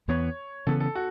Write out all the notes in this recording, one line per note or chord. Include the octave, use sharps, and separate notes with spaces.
E2 E3 B3 C#5
C#3 E3 B3 A4
A4
F#4